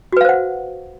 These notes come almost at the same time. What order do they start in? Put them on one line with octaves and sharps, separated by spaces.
F#4 B4 F5 C5 F#5